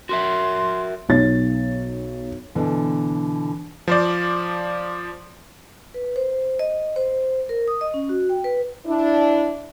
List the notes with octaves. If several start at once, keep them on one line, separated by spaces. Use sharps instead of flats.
F#4 A#4 E5 C6
B1 D#4 C#5 A6
B2 D3 E3
F3 C5 D5
B4
C5
D#5
C5
A#4
D#6
D#5
C#4
F#4
G5
B4
D4 E4